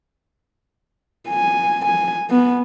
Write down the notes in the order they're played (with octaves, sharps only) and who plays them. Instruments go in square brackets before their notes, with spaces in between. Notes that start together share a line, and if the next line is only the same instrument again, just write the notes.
[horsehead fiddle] G#5
G#5
B3